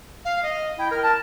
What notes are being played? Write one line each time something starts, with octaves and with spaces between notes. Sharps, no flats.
F5
D#5
E4 G5
A#4 F6
A5